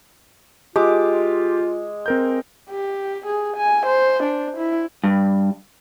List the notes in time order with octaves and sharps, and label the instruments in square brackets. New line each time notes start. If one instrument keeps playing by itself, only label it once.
[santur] G#3 D6 [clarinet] F4 [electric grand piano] G4
[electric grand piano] C4 A#4 G6
[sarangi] G4
G#4
G#5
C5
D4
E4
[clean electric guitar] G2